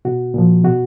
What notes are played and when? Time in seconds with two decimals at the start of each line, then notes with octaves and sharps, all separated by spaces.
0.05 B2 F#4
0.34 A#2 F3
0.64 B2 F#4